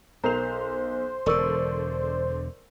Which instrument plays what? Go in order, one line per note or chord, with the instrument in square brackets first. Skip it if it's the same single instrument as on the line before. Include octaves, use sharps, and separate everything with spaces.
[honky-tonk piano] B1 F7 [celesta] A#4 A#5 [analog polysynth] C5
[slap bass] E1 D3 [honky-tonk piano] A4 D5 [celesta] A#4 C#6 E6